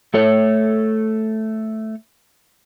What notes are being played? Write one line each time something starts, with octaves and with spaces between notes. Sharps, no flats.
A3 A4 C#5